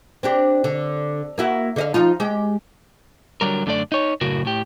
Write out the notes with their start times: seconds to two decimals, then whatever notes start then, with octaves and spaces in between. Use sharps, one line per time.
0.23 C4 D4 G4
0.64 D3
1.38 A#3 E4 F#4
1.76 D3 D#5 F5
1.94 F3 D#4 F4
2.20 G#3 G4
3.41 D3 F#3 G3 A#4
3.66 F#2 D3 A3 A4 D5
3.92 D#4 C#5
4.21 F#2 A2 C#3 F#4 A#4
4.45 A2 G4